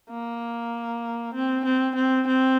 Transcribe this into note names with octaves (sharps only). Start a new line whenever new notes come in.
A#3
C4
C4
C4
C4